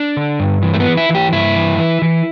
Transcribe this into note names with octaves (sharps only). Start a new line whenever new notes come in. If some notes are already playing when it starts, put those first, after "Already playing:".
Already playing: D4
D3
G2
E3
A3
B3
E3
E4
E3
G4
G2 E4
E3
E3
E3